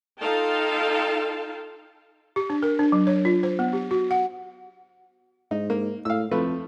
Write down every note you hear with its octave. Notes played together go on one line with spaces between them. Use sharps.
D#4 F4 A4 F5 G5 A5
G4
D4
A#4
D4
F#3
C#5
F4
C5
B3
G4
F#4
F#5
G#2 D#4
A#3
A2 F5 E6
F2 F3 A3 B4